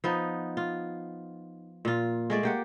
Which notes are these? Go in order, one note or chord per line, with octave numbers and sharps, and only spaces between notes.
F3 B3 D#4
F4
A#2 F4
G#3 A3 D5
A#3 G4 F#5